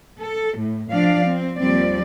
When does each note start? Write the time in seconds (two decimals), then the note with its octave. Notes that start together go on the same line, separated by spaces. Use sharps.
0.21 A4
0.58 A2
0.91 F3 D4 D5 F5
1.25 C4
1.58 D#2 F3 G3 C4 D5